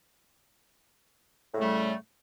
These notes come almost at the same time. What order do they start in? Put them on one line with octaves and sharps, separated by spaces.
A2 C#3 A3 G3